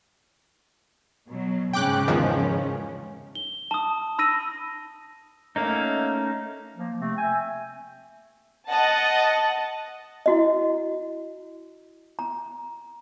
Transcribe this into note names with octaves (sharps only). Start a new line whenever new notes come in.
B2 F#3
G#2 C#3 C#4 G5 D6 F#6
E2 D#3 F3
G7
A5 D#6
B5 E6 A#6 D#7
A3 A#3 C#4 D#4
F3 A#3
C3 A3 C4
E5 G5 G#5
D#5 F#5 A5
E4 F#4 D#5
A#5